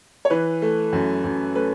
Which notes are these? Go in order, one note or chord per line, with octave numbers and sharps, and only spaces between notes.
C#5
E3 B4
A3
F#2
F#2
A3 B4